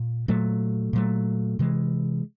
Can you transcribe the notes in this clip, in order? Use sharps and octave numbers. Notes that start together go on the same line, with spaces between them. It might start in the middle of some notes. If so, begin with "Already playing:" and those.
Already playing: A#2
A#2 F#3 A3
A#2 F#3 A3
C3 E3 G#3